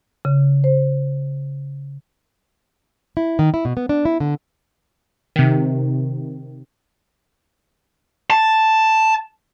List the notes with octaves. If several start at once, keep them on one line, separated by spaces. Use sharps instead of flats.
C#3
C5
E4
D#3
E4
B2
B3
D4
E4
D3
C3 D#3
A5